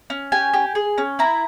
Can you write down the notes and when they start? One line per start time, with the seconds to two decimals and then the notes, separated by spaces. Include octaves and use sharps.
0.10 C#4
0.32 G4 G#5
0.53 G4
0.75 G#4
0.98 C#4
1.19 E4 A#5